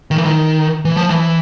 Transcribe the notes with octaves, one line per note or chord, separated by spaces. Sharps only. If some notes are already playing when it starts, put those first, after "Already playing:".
D#3
E3
D#3
E3
F3
E3